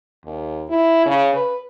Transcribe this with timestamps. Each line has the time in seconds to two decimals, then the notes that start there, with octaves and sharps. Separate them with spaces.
0.25 D#2
0.70 E4
1.06 C#3
1.34 B4